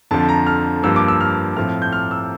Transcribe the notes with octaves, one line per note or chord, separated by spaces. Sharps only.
F2 D3 F3 A5
A#5
F6
G2 F3 A#3 E6
D6
E6
F6
A2 F3 C4 F6
G6
F6
E6